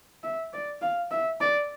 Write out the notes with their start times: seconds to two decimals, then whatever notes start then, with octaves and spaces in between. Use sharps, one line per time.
0.23 E5
0.53 D5
0.82 F5
1.11 E5
1.41 D5